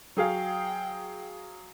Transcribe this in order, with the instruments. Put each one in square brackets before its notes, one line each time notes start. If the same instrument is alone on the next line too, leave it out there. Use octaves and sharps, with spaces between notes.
[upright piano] F#3 G#4 F5 [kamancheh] G5